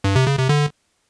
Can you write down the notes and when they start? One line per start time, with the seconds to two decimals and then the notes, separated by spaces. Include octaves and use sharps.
0.04 G2
0.16 C3
0.27 C#3
0.38 C3
0.49 D3